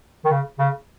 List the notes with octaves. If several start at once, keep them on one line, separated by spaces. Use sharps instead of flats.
D#3
C#3
C#3